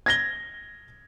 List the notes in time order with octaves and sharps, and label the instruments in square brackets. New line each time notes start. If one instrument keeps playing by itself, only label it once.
[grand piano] G#6 A#6 G7